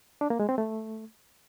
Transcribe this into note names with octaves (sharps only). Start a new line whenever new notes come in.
D4
A#3
G#3
C4
A3